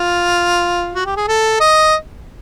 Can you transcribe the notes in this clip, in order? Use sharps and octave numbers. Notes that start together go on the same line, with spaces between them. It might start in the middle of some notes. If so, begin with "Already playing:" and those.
Already playing: F4
F#4
G4
G#4
A4
D#5